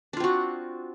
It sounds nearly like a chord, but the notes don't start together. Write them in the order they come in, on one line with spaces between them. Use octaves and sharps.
D4 F4 C4 F#4